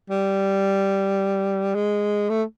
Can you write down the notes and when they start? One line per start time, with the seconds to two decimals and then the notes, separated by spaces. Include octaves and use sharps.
0.10 G3
1.75 G#3
2.29 A3